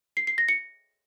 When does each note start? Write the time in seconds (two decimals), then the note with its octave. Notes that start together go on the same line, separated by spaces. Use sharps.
0.17 C7
0.27 C7
0.38 A#6
0.49 C#7